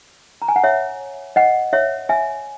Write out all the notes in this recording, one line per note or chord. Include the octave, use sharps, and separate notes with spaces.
A#5
G#5
F#5
C#5 E5
D#5 F#5
C#5 E5
E5 G#5